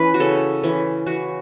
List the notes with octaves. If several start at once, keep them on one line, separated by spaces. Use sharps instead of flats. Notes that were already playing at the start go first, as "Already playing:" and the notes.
Already playing: E3 C#4 B4
F#4
C#3 A4
E3 C#4
E3 F#4